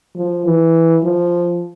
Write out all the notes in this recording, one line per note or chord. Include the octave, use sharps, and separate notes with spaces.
F3
E3
F3